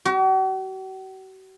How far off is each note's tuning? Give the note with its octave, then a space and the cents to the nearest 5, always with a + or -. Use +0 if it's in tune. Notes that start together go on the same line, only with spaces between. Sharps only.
F#4 +45